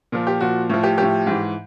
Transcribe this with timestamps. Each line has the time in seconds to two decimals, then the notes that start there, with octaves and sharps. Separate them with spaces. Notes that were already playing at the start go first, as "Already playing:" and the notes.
0.12 A#2 F3
0.27 G4
0.40 A#2 F3 F#4
0.70 A2 F3
0.83 G4
0.98 A2 F3 G4
1.26 G#2 E3